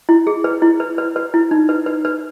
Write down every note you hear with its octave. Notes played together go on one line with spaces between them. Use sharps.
E4
G#4
B4
E4
B4
B4
B4
E4
D#4
B4
B4
B4